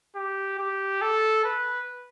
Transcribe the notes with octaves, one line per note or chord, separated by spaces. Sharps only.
G4
G4
A4
B4